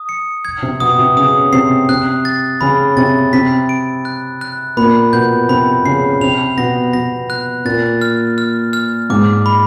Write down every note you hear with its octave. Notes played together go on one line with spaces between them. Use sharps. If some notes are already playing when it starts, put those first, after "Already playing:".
Already playing: D#6
C#7
G#6
C3 C4
B2 B3 D#6
C3 C4
C#3 C#4 D#6
C3 C4 C7
C3 C4 F#6
A6
C#3 C#4 B5
C3 C4 A6
C3 C4 B6
D7
F#6
F#6
A#2 A#3 B5
B2 B3 G6
C3 C4 B5
C#3 C#4 C7
C3 C4 F7
B2 B3 A#6
B2 B3 A#6
F#6
A#2 A#3 A6
F6
F6
F6
G#2 G#3 D6
B5